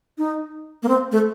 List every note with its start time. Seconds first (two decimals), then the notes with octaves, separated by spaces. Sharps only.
0.18 D#4
0.83 A#3
0.88 C4
1.12 A3